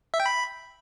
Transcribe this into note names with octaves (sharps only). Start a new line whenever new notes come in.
E5
G5
B5